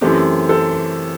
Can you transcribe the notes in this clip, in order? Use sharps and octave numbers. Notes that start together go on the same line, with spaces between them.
F#2 E3 A3 C4 G4
A4